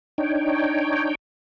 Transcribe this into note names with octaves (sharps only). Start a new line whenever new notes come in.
D4 D#4 C#5 G5